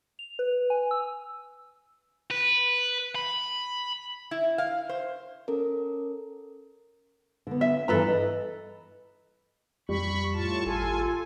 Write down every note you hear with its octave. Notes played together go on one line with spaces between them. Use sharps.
F7
B4
G#5
E6
B4
B5
E4
F5
C5
C#4 A4 A#4
D3 B3
E5
G2 E3 A4 B4 A#5
D#5
F2 G3 B5 C#6
A2 F4 A5 C#6
G#1 F4 A4 G#5